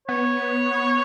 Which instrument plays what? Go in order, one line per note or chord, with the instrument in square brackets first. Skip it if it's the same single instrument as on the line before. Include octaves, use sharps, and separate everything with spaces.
[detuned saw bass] B3 [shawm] C#5